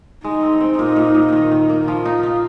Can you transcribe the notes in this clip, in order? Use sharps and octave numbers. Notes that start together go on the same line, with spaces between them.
G#3 D#4
C4
C4
A#2 D#4
A#2
A#2
D#3 D#4
D#3
A#3
F3 F4
D#4
D#4